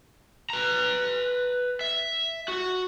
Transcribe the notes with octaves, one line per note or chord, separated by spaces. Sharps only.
B4 A#5
E5
F#4